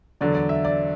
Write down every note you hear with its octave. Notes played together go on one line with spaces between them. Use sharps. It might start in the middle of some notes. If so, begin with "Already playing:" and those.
E2 D3 F#3 D5
D5
E5
D5